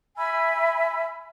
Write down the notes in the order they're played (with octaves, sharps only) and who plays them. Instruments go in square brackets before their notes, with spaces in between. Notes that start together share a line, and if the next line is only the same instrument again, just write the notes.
[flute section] E5 G#5 B5 E6